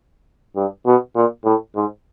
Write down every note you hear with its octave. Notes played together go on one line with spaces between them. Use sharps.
G2
B2
A#2
A2
G#2